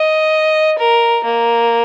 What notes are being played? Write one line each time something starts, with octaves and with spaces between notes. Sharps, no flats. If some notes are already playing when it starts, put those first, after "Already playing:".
Already playing: D#5
A#4
A#3